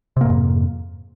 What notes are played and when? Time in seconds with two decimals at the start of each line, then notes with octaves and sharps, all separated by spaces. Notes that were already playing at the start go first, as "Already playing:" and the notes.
0.17 C3
0.21 A#3
0.25 G#2
0.30 F2